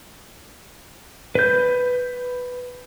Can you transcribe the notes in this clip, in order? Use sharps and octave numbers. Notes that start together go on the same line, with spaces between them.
B4 G6